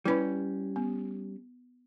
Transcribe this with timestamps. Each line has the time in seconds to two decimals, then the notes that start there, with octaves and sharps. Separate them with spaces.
0.05 G3 C#4 E4 B4 B5
0.76 B3